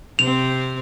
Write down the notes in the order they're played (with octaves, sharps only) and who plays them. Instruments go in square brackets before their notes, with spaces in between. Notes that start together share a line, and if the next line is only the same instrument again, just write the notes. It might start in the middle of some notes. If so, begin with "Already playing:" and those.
[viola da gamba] C3 C4 [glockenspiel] F7